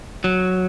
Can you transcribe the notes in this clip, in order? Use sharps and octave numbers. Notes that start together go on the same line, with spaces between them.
F#3